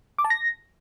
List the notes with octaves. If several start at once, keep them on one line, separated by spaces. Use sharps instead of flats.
D6
A5
A#6